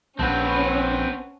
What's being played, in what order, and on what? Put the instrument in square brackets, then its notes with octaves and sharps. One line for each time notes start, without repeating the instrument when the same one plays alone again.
[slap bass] A#1 [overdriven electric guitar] C4 B4 [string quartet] C#4 [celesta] F#5 A5